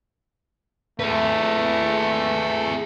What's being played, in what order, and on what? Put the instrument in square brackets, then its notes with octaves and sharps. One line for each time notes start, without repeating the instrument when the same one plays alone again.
[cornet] A3 [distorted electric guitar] G#4 B4